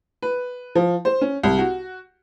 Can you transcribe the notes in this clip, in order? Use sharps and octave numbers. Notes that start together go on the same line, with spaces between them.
B4
F3
C5
C#4
C2
F#4